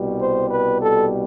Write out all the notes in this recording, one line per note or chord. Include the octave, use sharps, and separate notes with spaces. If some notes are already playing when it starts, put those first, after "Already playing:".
Already playing: C2 B2 G3
C5
B4
A4